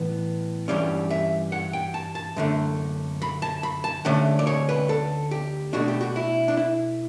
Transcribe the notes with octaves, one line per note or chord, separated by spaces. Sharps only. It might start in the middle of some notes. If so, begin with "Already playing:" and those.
Already playing: A2 E3 B3
G2 E3 G3 C#4 D5
E5
F#5
G5
A5
A5
F#2 D3 A3
B5
A5
B5
A5
D2 D3 A3 C#4 F#5
D5
C#5
B4
A4
G4
B2 A3 D4 F#4
G4
F#4
E4
D4
E4